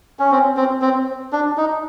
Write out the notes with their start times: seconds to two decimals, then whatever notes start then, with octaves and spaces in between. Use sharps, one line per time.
0.19 C#4
0.31 C4
0.57 C4
0.82 C4
1.33 D4
1.57 D#4